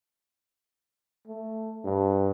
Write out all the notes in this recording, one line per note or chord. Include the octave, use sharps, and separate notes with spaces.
A3
G2